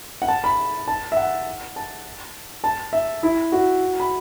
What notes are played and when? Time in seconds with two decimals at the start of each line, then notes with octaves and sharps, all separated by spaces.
0.22 F#5
0.28 A5
0.44 B5
0.88 A5
1.12 E5
1.17 F#5
1.76 A5
2.64 A5
2.93 E5
3.23 E4
3.52 F#4
4.00 B5